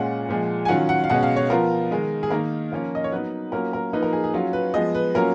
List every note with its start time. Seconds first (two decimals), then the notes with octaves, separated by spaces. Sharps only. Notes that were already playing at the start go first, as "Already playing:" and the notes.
Already playing: A#2 G#3 C#4 F4 F#5
0.29 A#2 F3 G#3
0.65 G#5
0.68 D#3 F#3 C#4 F4 F#5
0.89 F#5
1.04 F5
1.10 B2 G#3 C#4 F#5
1.23 F5
1.36 C#5
1.50 F3 B3 F4 A#4
1.91 D#3 G#3 D#4
2.23 G#4
2.31 D#3 A#3 D#4 A#4
2.72 F3 A#3 C#4 F4
2.95 D#5
3.04 C#5
3.11 F#3 B3 D#4 B4
3.52 F#3 A#3 C#4 F4 A#4
3.73 A#4
3.93 F3 A#3 D#4 B4
4.03 A#4
4.13 G#4
4.24 G#4
4.33 F#3 C#4 F4
4.53 B4
4.74 F3 G#3 B3 D#5
4.95 B4
5.15 F#3 A#3 C#4 F4 A#4